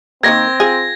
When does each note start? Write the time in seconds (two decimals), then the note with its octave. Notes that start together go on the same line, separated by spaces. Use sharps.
0.23 D#3 G3 A#3 C4 G#6 A#6
0.60 F4 G#4